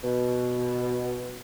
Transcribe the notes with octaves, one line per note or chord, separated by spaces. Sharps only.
B2